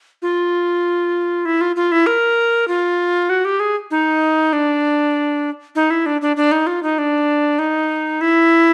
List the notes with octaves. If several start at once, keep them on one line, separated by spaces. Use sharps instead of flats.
F4
E4
F4
F4
E4
A#4
F4
F#4
G4
G#4
D#4
D4
D#4
E4
D4
D4
D4
D#4
F4
D#4
D4
D#4
E4